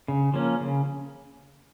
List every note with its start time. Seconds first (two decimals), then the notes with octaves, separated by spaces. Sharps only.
0.08 C#3
0.34 F3 A#3 C#4
0.60 C#3